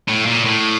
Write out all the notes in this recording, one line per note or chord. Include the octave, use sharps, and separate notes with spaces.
A2
A#2
A2